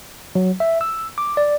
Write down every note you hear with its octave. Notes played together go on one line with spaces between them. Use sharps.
F#3
E5
E6
D6
D5